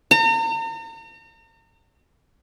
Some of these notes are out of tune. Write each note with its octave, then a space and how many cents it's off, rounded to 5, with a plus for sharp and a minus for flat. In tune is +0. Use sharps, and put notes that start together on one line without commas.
A#5 -40